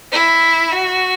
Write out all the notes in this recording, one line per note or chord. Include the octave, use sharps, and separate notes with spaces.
E4
F#4